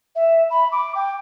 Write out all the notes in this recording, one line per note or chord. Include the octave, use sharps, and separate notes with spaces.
E5
B5
D6
G5